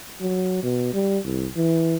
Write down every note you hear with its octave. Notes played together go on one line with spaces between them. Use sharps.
F#3
B2
G3
C2
E3